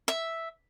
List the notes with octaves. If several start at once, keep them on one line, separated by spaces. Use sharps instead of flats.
E5